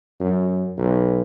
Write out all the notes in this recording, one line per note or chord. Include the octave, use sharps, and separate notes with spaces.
F#2
B1